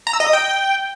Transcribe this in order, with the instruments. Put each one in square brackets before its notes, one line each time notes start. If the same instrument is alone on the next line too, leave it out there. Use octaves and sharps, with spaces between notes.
[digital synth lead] A#5
E6
D#5
D#6
G5